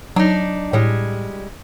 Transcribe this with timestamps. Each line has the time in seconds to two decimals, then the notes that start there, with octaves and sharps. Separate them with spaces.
0.16 F#3 D4 D#4
0.73 A2 G3 G#3